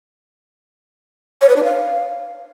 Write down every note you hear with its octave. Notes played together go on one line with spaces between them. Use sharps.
C#5
B4
D4
F5